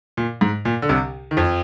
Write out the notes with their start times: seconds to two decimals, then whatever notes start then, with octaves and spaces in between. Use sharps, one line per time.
0.17 A#2
0.41 G#2
0.65 A#2
0.82 D3
0.89 C2 C3
1.31 D#3
1.37 F2 F3